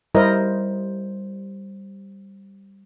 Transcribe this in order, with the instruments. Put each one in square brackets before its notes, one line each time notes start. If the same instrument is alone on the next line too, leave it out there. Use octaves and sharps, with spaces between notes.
[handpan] G3 C5 [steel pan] E4 A#4 D#5